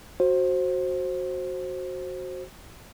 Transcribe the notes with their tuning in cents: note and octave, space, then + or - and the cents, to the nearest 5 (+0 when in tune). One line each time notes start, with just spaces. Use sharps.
F#4 +0 C5 +15